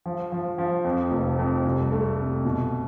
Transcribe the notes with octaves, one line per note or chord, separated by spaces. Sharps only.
F3
F3
F3
F2
F1
F2
C2
A3
C3
B2